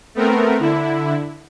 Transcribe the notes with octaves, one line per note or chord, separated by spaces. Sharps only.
A3 B3 C4 A#4
D3 E4